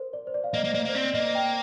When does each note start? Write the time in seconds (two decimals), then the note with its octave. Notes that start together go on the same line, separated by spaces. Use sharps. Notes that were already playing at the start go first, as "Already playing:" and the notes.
Already playing: A#4 C5
0.13 D5
0.27 C5
0.34 D5
0.44 F5
0.54 A#3 D#5
0.64 A#3
0.74 A#3 D5
0.85 A#3 C5
0.94 C4 D5
1.14 A#3 D#5
1.35 G5